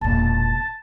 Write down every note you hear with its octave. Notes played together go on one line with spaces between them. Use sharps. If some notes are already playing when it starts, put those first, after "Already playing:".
E1 A#2 A5